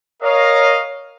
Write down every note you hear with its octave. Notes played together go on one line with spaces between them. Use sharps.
A#4 C#5 D#5 F5